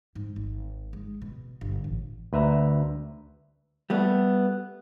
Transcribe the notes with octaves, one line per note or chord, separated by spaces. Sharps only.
G#2
G#1
G#3
B2
G1
A1
D2 B4 E5 A#5
G3 A3 B3